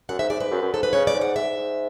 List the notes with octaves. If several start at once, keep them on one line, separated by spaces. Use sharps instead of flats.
F#2 F#5
G#2 E5
G#2 D5
G#2 B4
F#2
F#2
G#2 A4
G#2 B4
C#3 C#5
D5
G#2
F#5
G#2 E5
G#2